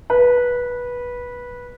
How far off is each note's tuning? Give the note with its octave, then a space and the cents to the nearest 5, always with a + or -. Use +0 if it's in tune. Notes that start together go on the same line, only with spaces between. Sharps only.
B4 -15